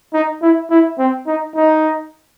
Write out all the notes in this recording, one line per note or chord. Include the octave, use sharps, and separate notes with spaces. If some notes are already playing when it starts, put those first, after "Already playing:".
D#4
E4
E4
C4
D#4
D#4